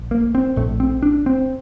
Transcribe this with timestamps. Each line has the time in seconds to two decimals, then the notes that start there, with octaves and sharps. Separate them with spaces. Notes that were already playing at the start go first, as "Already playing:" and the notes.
Already playing: A#1
0.11 A#3
0.35 C4
0.56 A#1 A2 A3
0.80 C4
1.03 D4
1.26 C4